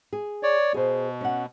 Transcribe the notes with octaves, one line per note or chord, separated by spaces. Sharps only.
G#4
C#5 D5
B2 G#4 C5
C#4 F#5